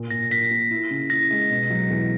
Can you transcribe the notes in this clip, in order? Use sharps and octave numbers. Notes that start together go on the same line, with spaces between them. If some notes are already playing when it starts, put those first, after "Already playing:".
Already playing: A#2
A#2 A#6
A#2 B6
A#3
E4
C#3
E4 A#6
G#3
B2
F#3
E2